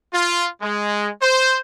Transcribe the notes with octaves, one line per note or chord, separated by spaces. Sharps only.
F4
G#3
C5